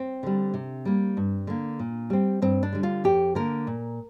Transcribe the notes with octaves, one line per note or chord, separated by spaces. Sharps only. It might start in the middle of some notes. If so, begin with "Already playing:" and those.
Already playing: C4
D3 G3
C3
G3 A#3
G2
D3 A#3
A#2
G3 C4
G2 C4
D4
D3 G3
F4
F2 G4
D3 A#3 A#4
A#2